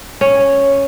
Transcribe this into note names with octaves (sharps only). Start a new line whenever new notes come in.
C#4